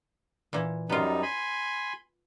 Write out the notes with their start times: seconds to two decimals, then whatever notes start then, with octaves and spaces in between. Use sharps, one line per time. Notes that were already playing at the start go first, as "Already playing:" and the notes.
0.53 A#2 E3
0.89 F#2 G3 B3 D#4 F4
1.23 G#5 B5 C6